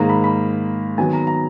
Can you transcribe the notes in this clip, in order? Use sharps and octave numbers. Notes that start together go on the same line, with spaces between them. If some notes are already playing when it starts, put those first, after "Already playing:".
Already playing: G#2 D#3 A#3 A#5
B5
B5
D#3 F#3 B3 G#5
A#5
A#5